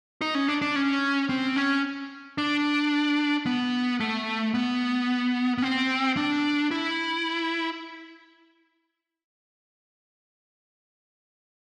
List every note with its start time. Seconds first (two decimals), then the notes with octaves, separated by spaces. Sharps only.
0.21 D#4
0.35 C#4
0.48 D4
0.62 D4
0.76 C#4
1.29 C4
1.56 C#4
2.38 D4
3.46 B3
4.00 A3
4.54 B3
5.58 B3
5.62 C4
6.17 D4
6.71 E4